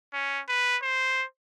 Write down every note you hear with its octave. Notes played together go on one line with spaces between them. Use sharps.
C#4
B4
C5